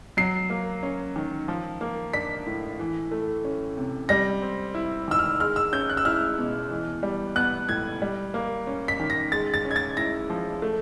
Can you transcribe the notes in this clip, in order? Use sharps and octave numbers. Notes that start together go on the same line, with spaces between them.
F#3 C7
A#3
C#4
D#3
F3
A#3
D4 B6
A2
E3
A3
C#4
C3
G3 A#6
C4
E4
D#3 E6
F6
G#3 F6
E6
C#4 G6
F#6
E6
E4 F6
B2
E3
G3
B3 F#6
A2 G#6
G3
A#3
C#4
B6
D#3
A#6
G#3 A6
A6
C#4
G#6
A6
E4 A#6
F3
A3